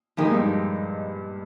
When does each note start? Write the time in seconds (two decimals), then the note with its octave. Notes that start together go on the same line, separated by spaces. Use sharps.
0.17 A#2 F3 G#3 D#4 G4 A#4
0.25 G#2
0.31 G2
0.38 G#2